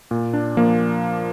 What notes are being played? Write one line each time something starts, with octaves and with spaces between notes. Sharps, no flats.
A#2
D4
F3 A#3